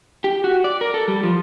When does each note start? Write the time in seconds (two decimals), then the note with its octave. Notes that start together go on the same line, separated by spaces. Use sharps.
0.24 G4
0.44 F#4
0.64 D5
0.81 A#4
0.94 A4
1.08 G3
1.23 F3